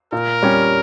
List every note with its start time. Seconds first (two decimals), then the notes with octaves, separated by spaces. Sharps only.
0.12 A#2 A#4
0.43 G3 C#4 G4